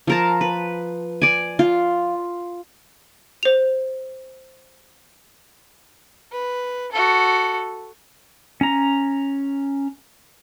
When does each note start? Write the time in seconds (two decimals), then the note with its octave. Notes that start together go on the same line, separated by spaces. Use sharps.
0.07 F3 A#4 A5
0.41 B4
1.21 D5 G#5
1.59 F4
3.43 C5 F7
6.32 B4
6.92 F#4 A4
8.61 C#4 A#5